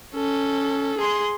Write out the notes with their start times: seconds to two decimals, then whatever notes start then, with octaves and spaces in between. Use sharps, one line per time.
0.14 C#4 A4
0.98 G#4 C6